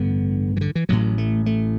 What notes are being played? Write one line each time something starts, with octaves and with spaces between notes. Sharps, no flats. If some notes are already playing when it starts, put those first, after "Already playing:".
Already playing: A1 G2 D3 B3
E3
D3
E3
A1 A2 F#3
A3
A3